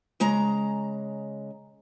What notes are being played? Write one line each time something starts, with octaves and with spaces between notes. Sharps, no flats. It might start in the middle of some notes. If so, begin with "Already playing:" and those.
C#3 G#3 A#5